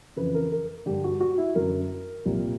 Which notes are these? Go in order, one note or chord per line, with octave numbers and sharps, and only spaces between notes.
F2 C#3 E3 B4
A#4
A#4
G2 D3 G4
F#4
F#4
E4
F#2 D3 A#4
C2 A#2